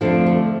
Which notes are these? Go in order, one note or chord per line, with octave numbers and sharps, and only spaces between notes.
F2 D3 F3 A3 D4
A3